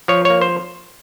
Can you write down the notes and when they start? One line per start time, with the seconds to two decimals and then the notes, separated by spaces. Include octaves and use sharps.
0.08 F3 C#5
0.25 A#3 C#5
0.41 C5